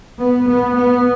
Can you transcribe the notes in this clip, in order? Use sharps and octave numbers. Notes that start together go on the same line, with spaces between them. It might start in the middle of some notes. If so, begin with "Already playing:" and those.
B3
B3
B3